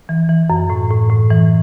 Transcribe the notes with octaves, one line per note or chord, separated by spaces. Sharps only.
E3
E3
F#2
A2
A2
A2
E3